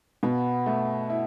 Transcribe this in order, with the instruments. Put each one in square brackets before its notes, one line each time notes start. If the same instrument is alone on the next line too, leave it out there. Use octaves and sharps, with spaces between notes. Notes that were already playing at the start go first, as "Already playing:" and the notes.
[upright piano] B2 [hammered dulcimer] B3
[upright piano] A3
E4